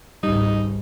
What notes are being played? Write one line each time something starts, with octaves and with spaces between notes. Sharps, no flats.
G#1 C#2 G3 D#4